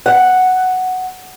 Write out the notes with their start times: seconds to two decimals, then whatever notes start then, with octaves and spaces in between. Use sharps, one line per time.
0.06 F#5